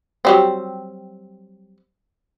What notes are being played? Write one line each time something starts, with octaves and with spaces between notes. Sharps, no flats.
F#3 G3 C4